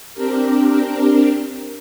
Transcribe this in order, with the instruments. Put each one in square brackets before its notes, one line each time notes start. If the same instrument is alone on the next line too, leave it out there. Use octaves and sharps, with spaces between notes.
[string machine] C4 D4 G4 A#4